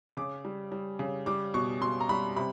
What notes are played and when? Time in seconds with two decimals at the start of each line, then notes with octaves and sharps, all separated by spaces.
0.17 C#3 D6
0.45 G3
0.72 G3
0.99 C#3
1.26 G3 D6
1.54 B2 C#6
1.81 B2 C6
2.00 A#5
2.09 G3 B5
2.36 C3 B5